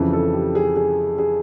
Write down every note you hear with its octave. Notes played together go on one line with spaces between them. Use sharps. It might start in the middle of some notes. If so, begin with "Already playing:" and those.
Already playing: F2 C#3 E3
A4
G4
G#4
G#4
G#4